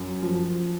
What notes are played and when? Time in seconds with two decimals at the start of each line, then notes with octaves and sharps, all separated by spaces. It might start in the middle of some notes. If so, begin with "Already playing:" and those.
Already playing: F#2
0.23 F3